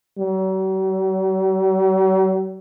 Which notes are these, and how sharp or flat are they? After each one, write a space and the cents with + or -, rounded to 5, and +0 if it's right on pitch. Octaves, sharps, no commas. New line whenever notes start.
F#3 +45